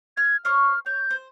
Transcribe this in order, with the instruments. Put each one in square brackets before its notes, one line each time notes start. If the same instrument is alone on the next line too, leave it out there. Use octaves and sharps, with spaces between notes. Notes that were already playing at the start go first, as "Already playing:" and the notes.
[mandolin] F6 [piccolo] G#6
[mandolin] C5 C#5 C#6 [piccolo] F6
[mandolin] C#5 [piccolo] G6
[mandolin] C5